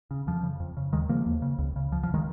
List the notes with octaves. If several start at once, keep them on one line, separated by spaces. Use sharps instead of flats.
C#3
F2 F3
C#3
F2
C#3
D#2 D#3 G#3
C#3 F3 A#3
D#2
C#3
C#2
C#3
C#2 F3
F3
C#3
D#3 G#3